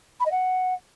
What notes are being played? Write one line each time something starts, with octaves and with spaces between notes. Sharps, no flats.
B5
D#5
F#5